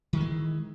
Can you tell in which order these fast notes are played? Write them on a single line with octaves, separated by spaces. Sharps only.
D#3 E3 G#3